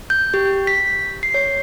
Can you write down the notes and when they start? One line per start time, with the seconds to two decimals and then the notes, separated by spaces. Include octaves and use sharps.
0.10 G6
0.34 G4
0.67 B6
1.23 C7
1.34 C#5